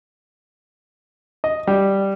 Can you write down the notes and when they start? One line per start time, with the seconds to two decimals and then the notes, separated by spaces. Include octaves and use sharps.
1.44 D#5
1.67 G3